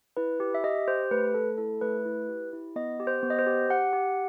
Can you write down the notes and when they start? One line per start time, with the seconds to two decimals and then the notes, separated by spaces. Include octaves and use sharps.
0.17 E4 B4
0.40 G4
0.55 E5
0.64 G4 D#5
0.88 G4 C5
1.11 A3 B4
1.34 A3 A4
1.58 E4 A4
1.81 A3 B4
2.06 E4
2.29 G4
2.53 E4
2.76 B3 D#5
3.00 G4
3.07 C5
3.23 B3
3.30 D#5
3.39 C5
3.47 G4
3.70 G4 F#5
3.93 G4